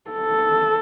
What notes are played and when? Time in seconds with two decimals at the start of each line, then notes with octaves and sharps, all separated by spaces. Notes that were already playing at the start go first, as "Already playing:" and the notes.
0.11 A4